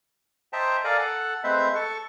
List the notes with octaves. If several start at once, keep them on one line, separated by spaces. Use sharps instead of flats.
C5 D#5 E5 G5 A5 A#5
A4 A#4 D5 F5 G#5 A#5
A4 F#5
G#3 A3 C4 B4 C5 E5
A4 C#6